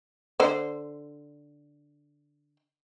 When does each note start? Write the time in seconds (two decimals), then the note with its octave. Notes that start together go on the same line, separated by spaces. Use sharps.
0.40 D3 C5